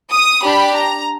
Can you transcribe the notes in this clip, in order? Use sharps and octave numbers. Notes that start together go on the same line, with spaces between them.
D#6
D4 G4 B5
A#5